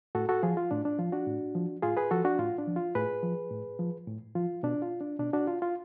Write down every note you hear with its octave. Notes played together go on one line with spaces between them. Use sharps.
A2 F#4 A4
F#4 A4
F3 F4 G#4
F4
A2 D4
D4
F3 F4
D4 F#4
A2
F3
A2 F4 G#4
G#4 B4
F3 F#4 A4
D4 F#4
A2 F4
D4
F3
F4
A2 G#4 B4
F3
A2
F3
A2
F3 F4
B2 D4
F4
D4
B2 D4
D4 F#4
F4
F4